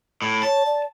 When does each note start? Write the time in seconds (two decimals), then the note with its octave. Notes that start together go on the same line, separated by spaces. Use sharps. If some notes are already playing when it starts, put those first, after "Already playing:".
0.22 A2
0.43 C#5 A5
0.66 D5